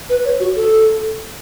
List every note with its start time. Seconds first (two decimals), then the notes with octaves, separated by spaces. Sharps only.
0.10 B4
0.25 C#5
0.40 F#4
0.56 A4